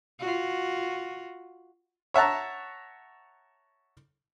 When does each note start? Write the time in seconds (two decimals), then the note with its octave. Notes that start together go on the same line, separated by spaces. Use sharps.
0.19 F4 F#4
2.14 C#5 E5 F#5 A5 A#5